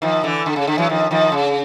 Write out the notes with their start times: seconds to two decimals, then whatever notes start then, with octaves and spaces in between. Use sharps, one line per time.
0.02 D#3 F3
0.24 D3 E3
0.46 D3
0.56 C#3
0.67 D3
0.78 E3 F#3
0.89 D#3 F3
1.11 D#3 F3
1.32 C#3